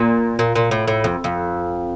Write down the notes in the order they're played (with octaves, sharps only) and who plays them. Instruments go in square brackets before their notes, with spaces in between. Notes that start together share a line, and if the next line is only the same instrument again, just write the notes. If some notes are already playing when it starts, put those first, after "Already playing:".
Already playing: [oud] A#2
A#2
A#2
A2
A2
F2
F2